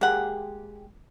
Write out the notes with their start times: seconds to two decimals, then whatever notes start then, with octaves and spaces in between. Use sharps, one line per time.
0.01 G#3 A#3 G4 G#4 F#5